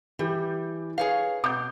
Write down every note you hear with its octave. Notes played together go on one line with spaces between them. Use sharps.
E3 G3 E4 G4
G#4 B4 C#5 F5
B2 D6 G6